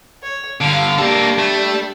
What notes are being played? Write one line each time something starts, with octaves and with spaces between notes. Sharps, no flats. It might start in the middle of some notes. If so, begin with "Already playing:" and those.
C#5
G2 D3 F5
G3 A#3 D4 A4
A3